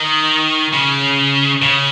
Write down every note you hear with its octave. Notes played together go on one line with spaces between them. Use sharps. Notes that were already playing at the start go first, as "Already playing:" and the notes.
Already playing: D#3
C#3
C#3